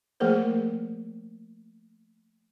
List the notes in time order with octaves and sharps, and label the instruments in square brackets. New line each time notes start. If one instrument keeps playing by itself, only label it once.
[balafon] F3 A3 A#3 G#4 A#4 C5